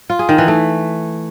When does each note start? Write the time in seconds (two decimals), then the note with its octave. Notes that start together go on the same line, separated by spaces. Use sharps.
0.10 F4
0.19 G#4
0.29 D#3
0.38 E3
0.48 A3